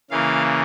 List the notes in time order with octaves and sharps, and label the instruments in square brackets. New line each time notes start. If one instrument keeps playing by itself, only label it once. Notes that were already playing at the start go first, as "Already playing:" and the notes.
[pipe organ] C#3 E3 A#3 F5